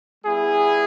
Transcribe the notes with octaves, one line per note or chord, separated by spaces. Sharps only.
G3 B3 E4 G#4